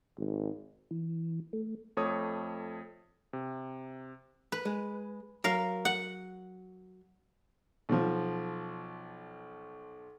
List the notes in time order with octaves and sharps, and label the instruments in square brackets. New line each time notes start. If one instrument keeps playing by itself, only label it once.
[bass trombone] G#1
[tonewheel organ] E3
A3
[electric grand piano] F2 A3 C#5 D#6
C3
[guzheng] B4
[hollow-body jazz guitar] G#3
[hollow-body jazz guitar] F#3 [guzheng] A#4 F5
[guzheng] F#5
[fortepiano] B1 F3